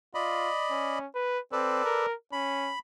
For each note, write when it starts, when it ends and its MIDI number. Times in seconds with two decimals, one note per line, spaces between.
0.15 0.49 65
0.15 0.99 74
0.15 0.99 75
0.15 0.99 83
0.70 1.06 61
1.15 1.39 71
1.52 1.81 60
1.52 2.06 69
1.52 2.06 71
1.52 2.06 74
1.85 2.14 70
2.32 2.72 61
2.32 2.79 83